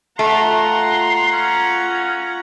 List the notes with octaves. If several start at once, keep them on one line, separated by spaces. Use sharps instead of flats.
A3 F4 F#5 A#5 C6
C#4